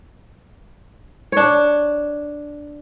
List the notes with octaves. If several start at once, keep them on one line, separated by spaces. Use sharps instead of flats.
D4 C#5